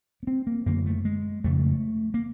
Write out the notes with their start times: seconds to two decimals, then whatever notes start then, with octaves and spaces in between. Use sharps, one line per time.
0.23 B3
0.27 C4
0.47 A#3
0.66 F#2 D3 A#3
0.86 A3
1.05 G#3
1.44 F2 C#3 A3
2.14 A#3